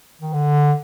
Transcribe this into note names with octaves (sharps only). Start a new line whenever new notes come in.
D#3
D3